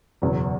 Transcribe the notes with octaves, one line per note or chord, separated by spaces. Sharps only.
F#1 E2 B2 F#3